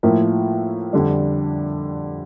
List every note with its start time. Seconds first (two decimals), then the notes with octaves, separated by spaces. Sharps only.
0.03 A2 F3 A#3 E4 A#4
0.93 F2 D3 G3 D4